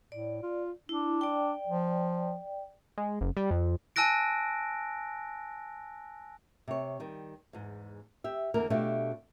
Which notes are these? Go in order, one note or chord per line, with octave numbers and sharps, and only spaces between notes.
A2 D5
F4
D4 E4
D5 G5
F3
G#3
F#1
G3
F2
G#5 A5 E6 F#6 A#6 D7
C3 C#5
D#3 G3
E2 G#2
G4 E5
E2 D3 A#3 A#4
B2 A3 D4 F4 G4